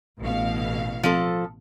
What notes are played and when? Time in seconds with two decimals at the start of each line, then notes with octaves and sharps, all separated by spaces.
0.20 A1 B2 F5
1.03 F3 C4 A4